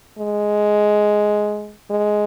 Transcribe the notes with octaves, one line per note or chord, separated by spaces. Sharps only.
G#3
G#3